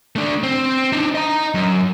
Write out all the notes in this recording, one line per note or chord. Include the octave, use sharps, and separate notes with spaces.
A3 D4
C4
D4 D#4
D#5 A#5
F#2